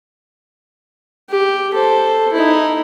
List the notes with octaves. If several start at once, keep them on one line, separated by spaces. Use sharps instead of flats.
G4
A4 C5
D#4 E4